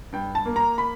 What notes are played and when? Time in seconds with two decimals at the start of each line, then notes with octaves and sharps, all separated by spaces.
0.12 G2 G5
0.35 A5
0.45 A#3
0.56 A#5
0.78 B5